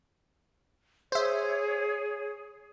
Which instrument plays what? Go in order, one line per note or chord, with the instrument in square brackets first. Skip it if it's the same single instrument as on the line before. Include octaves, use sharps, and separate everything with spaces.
[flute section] G#4 C#5 [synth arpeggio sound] C5 E5